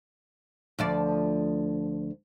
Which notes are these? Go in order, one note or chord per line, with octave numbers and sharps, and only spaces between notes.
D2 F3 D5